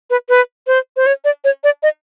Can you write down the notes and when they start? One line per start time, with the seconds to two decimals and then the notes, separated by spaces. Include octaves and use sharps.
0.10 B4
0.29 B4
0.67 C5
0.97 C5
1.06 C#5
1.25 D5
1.44 C#5
1.64 D5
1.83 D#5